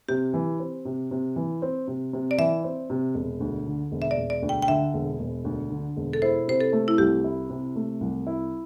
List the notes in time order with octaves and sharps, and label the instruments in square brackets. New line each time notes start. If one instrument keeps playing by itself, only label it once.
[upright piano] C3 [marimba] G4
[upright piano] E3
C4
C3
C3
E3
C4
C3
C3
[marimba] D5
[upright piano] E3 [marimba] E5
[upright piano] C4
C3
E1
D2
D3
E1
[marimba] E5
D5
[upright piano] E1
[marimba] D5
[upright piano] D2
[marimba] G5
G5
[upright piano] D3 [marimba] E5
[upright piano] E1
E1
D2
D3
E1
[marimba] A4
[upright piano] E4 [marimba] C5
[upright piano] C3 [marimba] C5
[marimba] A4
[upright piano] A3
[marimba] E4
[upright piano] C2 [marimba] G4
[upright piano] E4
C3
A3
C2
E4